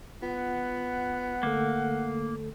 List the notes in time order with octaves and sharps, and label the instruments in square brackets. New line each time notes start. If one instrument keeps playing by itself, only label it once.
[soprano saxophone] B3 [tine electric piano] F4 [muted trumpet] F#5
[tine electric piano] D3 A3 A4 [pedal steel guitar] A#3